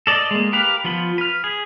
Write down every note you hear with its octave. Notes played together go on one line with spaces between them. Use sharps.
A4 D5 D#5
G#3 A#3
G4 A#4 B4 F5
F3 B3 F4 B5
B4 F6
G#4